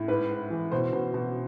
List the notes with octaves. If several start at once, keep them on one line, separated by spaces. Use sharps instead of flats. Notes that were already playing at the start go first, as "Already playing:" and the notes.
Already playing: A2
G#2 B4
G#2
E3
B2 C5
B2
B2